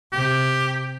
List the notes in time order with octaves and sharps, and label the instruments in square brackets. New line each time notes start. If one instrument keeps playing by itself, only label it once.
[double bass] C3 [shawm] G4